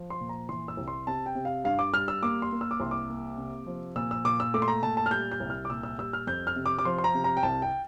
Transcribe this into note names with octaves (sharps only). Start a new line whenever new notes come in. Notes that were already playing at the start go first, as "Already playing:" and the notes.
Already playing: F3
C6
A#2
A#5
E3 C6
E6
C2
C6
C3 A5
G5
C3
F5
G2 F5
D6
G3 F6
E6
A#3 D6
C6
A#3
E6
D6
C2 C6
D6
A#3
C3
F3
A#2 E6
E6
A#2 D6
E6
A3 D6
C6
A#5
A#2 A5
A5
F6
G3 G6
G6
C2
F6
D6
A#2 E6
E6
G3 E6
F6
F2 G6
F6
C3
D6
D6
F3 C6
C6
A#5
C3
A#5
G5
C2 A5
G5